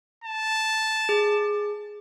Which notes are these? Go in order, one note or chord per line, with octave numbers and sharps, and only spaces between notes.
A5
G#4